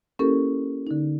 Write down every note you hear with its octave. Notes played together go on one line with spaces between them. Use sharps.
A#3 C#4 E4 G4 A4 A#4
D3 D#4